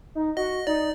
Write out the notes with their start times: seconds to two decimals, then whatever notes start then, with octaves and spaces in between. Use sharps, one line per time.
0.15 D#4
0.37 F#4 D#5
0.67 D#4 D5